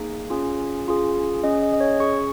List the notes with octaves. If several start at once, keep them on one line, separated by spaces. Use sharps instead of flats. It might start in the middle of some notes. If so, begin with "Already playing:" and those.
Already playing: A#3 D#4 G#4
C#4 F4 G#4
C#4 F4 G#4
C#4 G#4 D#5
D#5
D#5
C#5
C#4 G#4 C#6